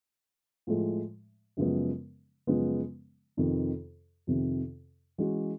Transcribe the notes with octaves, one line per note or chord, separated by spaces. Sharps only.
A2 F3 G#3
F#2 C#3 F3 G#3 B3
F#2 C#3 F3 G#3 B3
F2 C3 D#3
F2 C3 D#3
E3 G#3 C#4 F#4